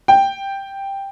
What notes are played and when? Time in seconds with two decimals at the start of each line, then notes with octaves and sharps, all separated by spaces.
0.08 G5